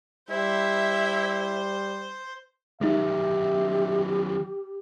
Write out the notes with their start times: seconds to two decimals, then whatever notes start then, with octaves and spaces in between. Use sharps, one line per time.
0.30 G3 E4 C5 E5
2.81 D#3 F#3 G#3 D#4 G4 E5